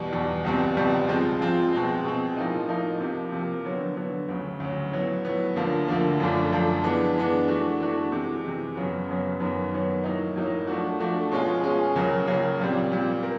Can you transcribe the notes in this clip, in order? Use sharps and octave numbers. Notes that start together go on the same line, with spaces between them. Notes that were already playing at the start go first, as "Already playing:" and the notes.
Already playing: E2 B2 G3
E2 B2 G3
C#2 B2 G3 C4
C#2 B2 G3 C4
F3 G#3 C4 F4
F3 G#3 C4 F4
B2 G#3 C4
B2 G#3 C4
A2 F3 A#3 D#4
A2 F3 A#3 D#4
C3 F3 A#3
C3 F3 A#3
D3 F#3 B3
D3 F#3 B3
D2 C#3 F#3
D2 C#3 F#3
A2 F#3 B3
A2 F#3 B3
D2 D3 F3 A#3
D2 D3 F3 A#3
F#2 D3 F3 A3 D4
F#2 D3 F3 A3 D4
E3 G#3 B3 D4
E3 G#3 B3 D4
E3 A3 D4 F#4
E3 A3 D4 F#4
C3 E3 G#3
C3 E3 G#3
F#2 C#3 F#3 B3
F#2 C#3 F#3 B3
F#2 D#3 F#3 B3
F#2 D#3 F#3 B3
A2 F#3 A#3 D#4
A2 F#3 A#3 D#4
F3 A3 D4 F#4
F3 A3 D4 F#4
B2 G#3 C#4 F4 G#4
B2 G#3 C#4 F4 G#4
C#2 C#3 F#3 A#3
C#2 C#3 F#3 A#3
A#2 G3 C4
A#2 G3 C4
A#4